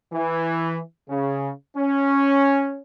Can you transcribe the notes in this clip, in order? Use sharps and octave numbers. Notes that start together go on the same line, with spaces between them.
E3
C#3
C#4